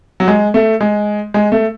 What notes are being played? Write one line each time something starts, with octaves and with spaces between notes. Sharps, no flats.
F#3
G#3
A3
G#3
G#3
A3